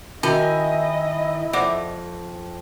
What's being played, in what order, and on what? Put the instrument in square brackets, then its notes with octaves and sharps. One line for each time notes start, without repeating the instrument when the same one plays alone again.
[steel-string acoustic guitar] D#3 G#5 [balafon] C#4 F#4 B5 [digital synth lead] E4 [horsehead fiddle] D#5
[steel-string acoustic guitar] F2 [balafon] D5 F#5 D6